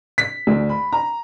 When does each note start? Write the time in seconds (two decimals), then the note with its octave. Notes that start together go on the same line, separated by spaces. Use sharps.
0.18 B6
0.47 D2
0.69 B5
0.92 A#5